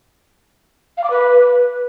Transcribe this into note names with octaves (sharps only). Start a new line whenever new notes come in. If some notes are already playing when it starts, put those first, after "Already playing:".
F5
D6
B4